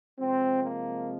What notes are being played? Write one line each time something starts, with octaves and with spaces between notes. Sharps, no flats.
C3 F3 G#3 C4
A#3